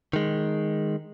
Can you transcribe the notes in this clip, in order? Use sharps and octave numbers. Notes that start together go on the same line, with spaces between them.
D#3 G#3